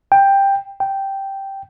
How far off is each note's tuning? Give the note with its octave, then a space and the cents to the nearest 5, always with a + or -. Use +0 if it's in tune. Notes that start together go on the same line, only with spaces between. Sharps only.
G5 +10
G5 -5